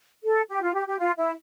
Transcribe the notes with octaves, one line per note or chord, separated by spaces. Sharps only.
A4
G4
F4
G4
G4
F4
E4